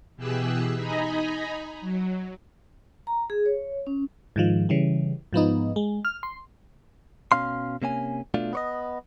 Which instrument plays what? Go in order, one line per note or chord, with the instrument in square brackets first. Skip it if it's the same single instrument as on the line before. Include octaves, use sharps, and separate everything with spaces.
[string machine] B2 E3 G4 G#4 E6 F#6
D#4 D#5 G#5 A#5 B5
F#3
[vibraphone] A#5
G#4
C#5
C#4
[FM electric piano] G#2 D#3 F3
C#3 E3 G3
G#2 F3 B3 D#4
G#3
F6
C6
[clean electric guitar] B2 C#4 F5 C6
C3 A#3 C#4 G#5
B2 A3 D4 F4
B3 C#5 D#5